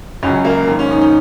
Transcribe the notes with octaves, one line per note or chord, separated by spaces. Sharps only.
C#2 C#3 F#3 C#4
A#3
G#1 G#2 D#3
C#4
D#4
D#4